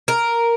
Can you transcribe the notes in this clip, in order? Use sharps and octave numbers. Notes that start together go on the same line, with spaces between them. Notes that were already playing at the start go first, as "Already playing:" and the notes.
A#4